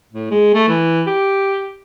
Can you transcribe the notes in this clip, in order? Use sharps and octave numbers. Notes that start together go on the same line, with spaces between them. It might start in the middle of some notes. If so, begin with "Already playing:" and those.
A2
G#3
A3
E3
G4